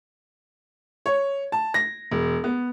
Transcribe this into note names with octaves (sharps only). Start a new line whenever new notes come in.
C#5
A5
A#6
E1
B3